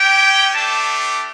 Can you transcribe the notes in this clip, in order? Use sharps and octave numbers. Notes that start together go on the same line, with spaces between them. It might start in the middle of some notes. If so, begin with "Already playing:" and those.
Already playing: C#4 G4 G5
A3 D4 G4 A5